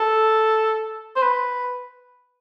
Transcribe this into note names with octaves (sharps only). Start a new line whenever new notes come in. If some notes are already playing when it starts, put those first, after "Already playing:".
Already playing: A4
C5
B4